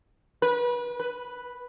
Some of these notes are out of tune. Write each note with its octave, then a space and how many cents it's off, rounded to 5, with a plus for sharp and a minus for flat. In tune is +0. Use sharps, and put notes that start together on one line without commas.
B4 -30
B4 +0